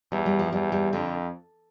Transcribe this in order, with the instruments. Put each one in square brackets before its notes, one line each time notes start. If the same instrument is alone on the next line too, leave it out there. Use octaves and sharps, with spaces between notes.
[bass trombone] E2 [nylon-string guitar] G3
[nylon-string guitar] G3
F3
[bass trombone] E2 [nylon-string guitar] G3
[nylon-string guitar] G3
[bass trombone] F2 [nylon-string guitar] D3